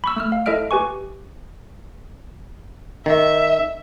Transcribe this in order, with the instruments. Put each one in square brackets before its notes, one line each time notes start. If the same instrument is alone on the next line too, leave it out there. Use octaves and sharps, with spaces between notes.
[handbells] B5 C#6 E6
A3 E6 F6
F5
E4 A4 D#5 E5 F6 D7
G4 B4 G#5 C#6
[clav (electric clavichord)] D#3 [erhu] E5